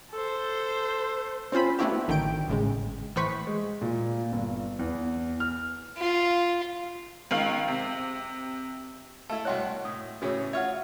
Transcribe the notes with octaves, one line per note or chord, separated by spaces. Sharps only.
A4 C5
C4 C#4 F4 C5 B5
A3 B3 D4 E4 F#4 G4
A1 D3 D#3 G5 D7
G#1 A2 C#3 G#3
A2 E3 B4 C5 C#6 B6
G#3
A#2
G1
E2
F6
F4
C#2 D#3 F5
C3
A3 E4 A5
C2 F#4 C#5 D#5 C6 F#6
A2 D#6
A2 C#3 E3 F#4 C#5
F4 C#5 E5 F#5